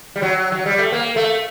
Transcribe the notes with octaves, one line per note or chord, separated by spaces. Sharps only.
G3
F#3
F#3
G3
A3
A#3
A3